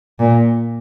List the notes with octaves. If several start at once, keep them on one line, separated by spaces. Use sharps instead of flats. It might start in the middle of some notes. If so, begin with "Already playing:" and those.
A#2